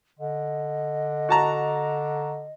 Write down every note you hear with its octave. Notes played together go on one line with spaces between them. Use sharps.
D3 D#5
F#4 A5 A#5